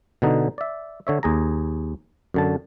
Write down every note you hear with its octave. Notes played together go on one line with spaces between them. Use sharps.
B2 D3 D#4
D5 E5
D3 C#5 E5
D#2 G#4 A#5
F#2 D3 A5